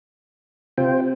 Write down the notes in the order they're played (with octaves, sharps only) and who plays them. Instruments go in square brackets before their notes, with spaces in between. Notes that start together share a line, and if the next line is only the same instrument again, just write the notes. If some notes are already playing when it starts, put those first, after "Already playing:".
[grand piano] C3 [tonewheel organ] F4 C5 G5